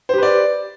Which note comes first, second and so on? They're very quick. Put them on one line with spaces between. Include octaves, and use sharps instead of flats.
C5 G4 B4 D5